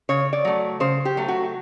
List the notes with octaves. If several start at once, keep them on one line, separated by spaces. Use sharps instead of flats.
C#3 C#5
D5
F#3 A3
C#3 C5
G4
F#3 A3
F#4